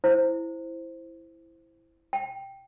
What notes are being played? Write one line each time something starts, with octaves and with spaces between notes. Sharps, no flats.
E4 C5
G5